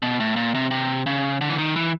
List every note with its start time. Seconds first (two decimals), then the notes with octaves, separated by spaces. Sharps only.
0.02 B2
0.20 A2
0.36 A#2
0.55 C3
0.71 C3
1.06 C#3
1.41 D3
1.49 E3
1.58 D#3
1.76 E3